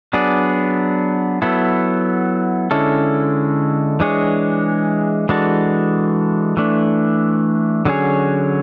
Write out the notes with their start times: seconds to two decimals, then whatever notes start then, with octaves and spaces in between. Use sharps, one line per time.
0.13 F#3 B3 D4 G#4 D5
1.42 F#3 B3 E4 A4
2.71 D3 G#3 C#4 E4 A4
4.00 E3 G#3 D4 G#4 C#5
5.29 E3 G#3 D4 F#4 A4
6.57 E3 A3 D4
7.85 D3 F#3 C#4 G#4 C#5